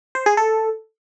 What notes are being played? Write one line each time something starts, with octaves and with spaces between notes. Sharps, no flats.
C5
G#4
A4